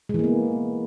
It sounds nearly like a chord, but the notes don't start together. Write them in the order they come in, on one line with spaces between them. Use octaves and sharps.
G#3 E3 A#3 B3